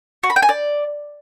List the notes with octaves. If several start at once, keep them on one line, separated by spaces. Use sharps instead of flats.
F#4
B5
G5
G#5
D5